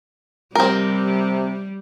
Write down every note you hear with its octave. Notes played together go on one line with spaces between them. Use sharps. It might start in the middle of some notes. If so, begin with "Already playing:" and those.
C3 G3 C4 A#4